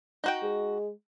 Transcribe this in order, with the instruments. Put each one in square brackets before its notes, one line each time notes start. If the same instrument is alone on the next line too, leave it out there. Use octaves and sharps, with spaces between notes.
[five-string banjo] D#4 F#4 G5
[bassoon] G#3